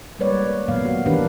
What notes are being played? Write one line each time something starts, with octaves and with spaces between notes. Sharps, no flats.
G3 G#3 A#3 B4 C#5 D5
A#2 D#3 F#3 A#3 B3 F5
F#4
D#3 E3 D4 G4 A#4 B4